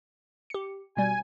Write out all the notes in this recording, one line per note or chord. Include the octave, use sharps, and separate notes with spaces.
G4 C#7
B2 G3 G#5